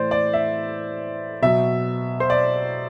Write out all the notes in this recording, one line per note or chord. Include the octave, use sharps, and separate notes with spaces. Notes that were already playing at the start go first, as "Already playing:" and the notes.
Already playing: A2 E3 C5 D5
D5
E5
B2 F#3 E5
C5
D5